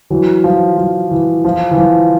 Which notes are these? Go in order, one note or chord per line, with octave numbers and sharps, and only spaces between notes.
E3 F#3
F3
F3
E3
F3
E3
F3